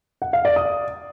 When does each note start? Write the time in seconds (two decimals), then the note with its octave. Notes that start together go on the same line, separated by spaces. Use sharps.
0.22 F#5
0.33 F5
0.45 D5
0.56 D#6